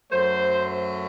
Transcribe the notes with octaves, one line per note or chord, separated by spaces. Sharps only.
F#2 F#3 A3 C5